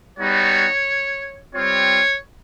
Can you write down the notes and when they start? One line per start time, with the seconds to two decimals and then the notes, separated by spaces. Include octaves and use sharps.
0.18 G3 B3 D#4 F#4 C#5
1.55 G3 C4 F4 C#5